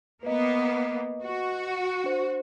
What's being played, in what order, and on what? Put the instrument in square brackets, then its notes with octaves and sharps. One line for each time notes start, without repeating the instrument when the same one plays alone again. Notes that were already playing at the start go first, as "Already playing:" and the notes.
[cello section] A#3 B3 [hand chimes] B4 D#5
[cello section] F#4
[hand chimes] D4 C5